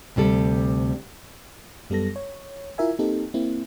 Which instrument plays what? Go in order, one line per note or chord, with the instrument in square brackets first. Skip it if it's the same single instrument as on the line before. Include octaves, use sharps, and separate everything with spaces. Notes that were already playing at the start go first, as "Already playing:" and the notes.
[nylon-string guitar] D2 C3 G3 A4
[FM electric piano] F#2 G3 B3 A4 A#6
C#5
E4 F4 A#4 E5 G#5
A#3 C4 D#4 G4 A4
A#3 C4 E4